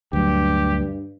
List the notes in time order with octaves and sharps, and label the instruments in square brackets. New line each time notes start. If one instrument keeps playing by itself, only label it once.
[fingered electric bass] D2 F#3 [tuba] G2 [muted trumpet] G4